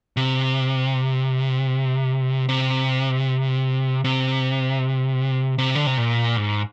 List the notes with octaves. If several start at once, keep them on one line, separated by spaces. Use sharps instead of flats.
C3
C3
C3
C3
D3
C3
A#2
G#2